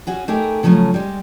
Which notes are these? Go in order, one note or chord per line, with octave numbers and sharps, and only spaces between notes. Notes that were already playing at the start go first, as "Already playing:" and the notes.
C#4 F#4 G#4
A3 D#4 G4 G#4 A#4
C#3 F3 F#3 A3 C#4
G3 G#3